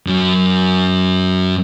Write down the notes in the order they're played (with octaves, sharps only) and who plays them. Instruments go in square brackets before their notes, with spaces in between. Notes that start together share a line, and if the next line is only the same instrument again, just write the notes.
[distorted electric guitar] F#2 F#3